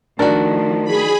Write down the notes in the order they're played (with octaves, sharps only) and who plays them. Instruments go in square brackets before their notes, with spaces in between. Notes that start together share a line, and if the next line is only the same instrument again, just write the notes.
[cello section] D#3 F3 A3 [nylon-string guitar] D4 F#4 [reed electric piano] A#4 A5
[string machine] G#4 B5